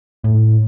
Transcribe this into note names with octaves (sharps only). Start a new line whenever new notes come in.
A2